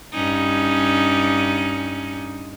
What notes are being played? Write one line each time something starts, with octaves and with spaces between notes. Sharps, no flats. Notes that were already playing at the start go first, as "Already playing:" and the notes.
G2 C#4 D#4